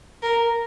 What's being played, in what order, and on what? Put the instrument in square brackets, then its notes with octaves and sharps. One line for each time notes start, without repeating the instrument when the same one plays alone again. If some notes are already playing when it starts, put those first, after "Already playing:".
[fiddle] A#4